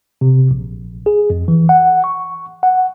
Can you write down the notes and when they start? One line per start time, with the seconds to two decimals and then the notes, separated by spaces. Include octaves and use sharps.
0.21 C3
0.51 A#1
1.06 G#4
1.30 F2
1.48 E3
1.69 F#5
2.04 C#6
2.63 F#5